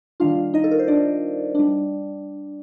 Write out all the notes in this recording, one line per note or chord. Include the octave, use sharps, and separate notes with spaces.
D#3 G3 D4 F4 F5
D#4 D#5
A4
A#4
C5
D4 D5
G3 D4